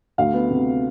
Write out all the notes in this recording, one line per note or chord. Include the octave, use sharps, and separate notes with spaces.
D2 F5
B3
C3